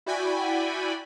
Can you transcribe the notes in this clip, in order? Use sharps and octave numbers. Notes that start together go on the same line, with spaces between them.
E4 F#4 D5 G5 G#5 B5